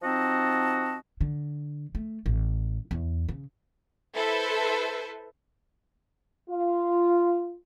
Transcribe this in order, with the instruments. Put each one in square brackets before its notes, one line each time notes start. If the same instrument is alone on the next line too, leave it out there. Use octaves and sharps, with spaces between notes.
[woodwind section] F3 C4 D#4 F#4 D#5 A5
[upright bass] D3
A3
A1
E2
C#3
[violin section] E4 A4 B4 C5 E5
[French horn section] F4